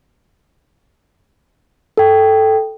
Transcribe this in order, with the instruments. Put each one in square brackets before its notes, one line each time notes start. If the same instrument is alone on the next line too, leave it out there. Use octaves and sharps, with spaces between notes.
[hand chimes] A4 G5